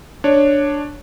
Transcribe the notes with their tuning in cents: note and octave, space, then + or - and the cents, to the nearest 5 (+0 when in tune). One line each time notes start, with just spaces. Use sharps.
D4 +0 C#5 +0